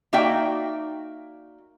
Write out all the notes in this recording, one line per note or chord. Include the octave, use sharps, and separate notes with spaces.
A#3 D#4 F#4 D5 E5 G5